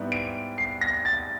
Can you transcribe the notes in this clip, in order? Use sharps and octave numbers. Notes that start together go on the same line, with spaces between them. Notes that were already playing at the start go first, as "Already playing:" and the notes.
Already playing: G#2 G3 B3 E4
D7
C7
A#6
A6